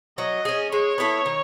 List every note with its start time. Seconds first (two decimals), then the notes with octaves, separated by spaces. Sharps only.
0.18 F#3 D#5
0.45 C#4 G#4
0.72 G#3 C#5
0.98 B3 E4 A4
1.26 D#3